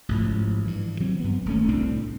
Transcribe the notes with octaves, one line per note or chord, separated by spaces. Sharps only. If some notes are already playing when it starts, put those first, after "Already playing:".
A1 G#2 F3
G2 E3
E3 F#3 C4
G2 B3
D#1 A3 C#4
C2 A2 C4 D4